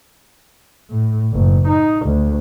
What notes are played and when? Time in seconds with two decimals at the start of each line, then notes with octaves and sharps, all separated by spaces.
0.90 A2
1.33 F#1
1.67 D#4
2.06 D2